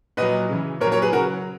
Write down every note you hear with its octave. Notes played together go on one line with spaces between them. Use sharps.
A#2 F#3 B4 D#5
C#3 E3
A#2 A#4 C#5
F#3
A#4 C#5
G#4 B4
C#3 F#3 F#4 A#4